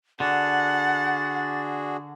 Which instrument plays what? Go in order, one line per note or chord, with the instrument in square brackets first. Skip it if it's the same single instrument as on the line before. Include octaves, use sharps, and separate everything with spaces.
[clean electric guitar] D3 [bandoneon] D4 F#4 G#4 [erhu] F#5 [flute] A6